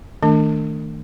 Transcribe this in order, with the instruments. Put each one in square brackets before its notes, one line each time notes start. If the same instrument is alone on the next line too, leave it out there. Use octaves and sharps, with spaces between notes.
[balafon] D#3 A3 D4